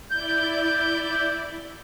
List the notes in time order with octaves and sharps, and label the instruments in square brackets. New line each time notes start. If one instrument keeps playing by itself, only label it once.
[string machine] E4 D5 [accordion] G6